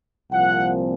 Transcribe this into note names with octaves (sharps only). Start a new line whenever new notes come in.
C2 A#2 F3 C4 F#5